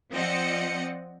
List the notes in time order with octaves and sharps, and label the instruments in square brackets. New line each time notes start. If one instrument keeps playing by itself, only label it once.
[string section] F3 C4 D5 D#5 F#5 C#7